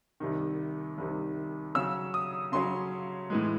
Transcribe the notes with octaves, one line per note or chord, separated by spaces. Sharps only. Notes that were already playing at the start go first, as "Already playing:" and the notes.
C2 C3 D#3
C2 C3 D#3
C#3 F#3 C#4 E6
D#6
C#3 F#3 C#4 C6
A2 E3 G#3